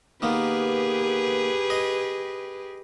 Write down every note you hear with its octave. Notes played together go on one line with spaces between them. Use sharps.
D#3 A#3 B3 G4 G#4 B4
D#5